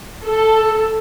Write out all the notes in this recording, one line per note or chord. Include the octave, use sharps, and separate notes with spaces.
A4